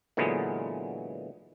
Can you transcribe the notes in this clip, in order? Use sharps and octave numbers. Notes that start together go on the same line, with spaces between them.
A#2 D3 E3 F#3 G#3 B3